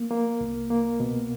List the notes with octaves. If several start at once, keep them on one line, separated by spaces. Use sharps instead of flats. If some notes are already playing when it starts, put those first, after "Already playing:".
Already playing: A#3
A#3
C2
A#3
B2